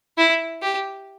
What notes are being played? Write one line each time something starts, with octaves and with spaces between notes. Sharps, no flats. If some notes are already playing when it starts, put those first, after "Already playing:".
E4
G4